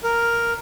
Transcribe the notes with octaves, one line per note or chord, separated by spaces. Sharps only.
A#4